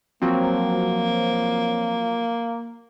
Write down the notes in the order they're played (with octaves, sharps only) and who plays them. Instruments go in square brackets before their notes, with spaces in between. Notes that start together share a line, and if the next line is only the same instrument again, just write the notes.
[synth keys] F3 F#3 C4 [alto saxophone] A#3